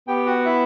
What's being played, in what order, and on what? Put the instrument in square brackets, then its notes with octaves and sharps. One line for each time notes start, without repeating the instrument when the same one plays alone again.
[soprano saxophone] B3 [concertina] G4 G5
[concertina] F#4 F#5
E4 E5